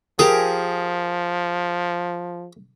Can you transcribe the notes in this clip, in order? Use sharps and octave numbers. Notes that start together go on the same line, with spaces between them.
F3 G4 G#4 A#4 G#5